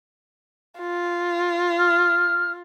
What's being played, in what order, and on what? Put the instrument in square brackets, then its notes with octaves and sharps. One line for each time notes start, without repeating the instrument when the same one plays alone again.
[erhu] F4
[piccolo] F6